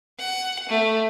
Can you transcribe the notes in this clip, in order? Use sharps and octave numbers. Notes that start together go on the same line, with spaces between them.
F#5
A3